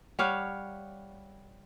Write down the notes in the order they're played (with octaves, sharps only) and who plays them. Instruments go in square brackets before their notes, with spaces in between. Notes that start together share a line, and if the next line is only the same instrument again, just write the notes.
[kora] G3 C#5 F5 [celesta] F#5 F6 F#6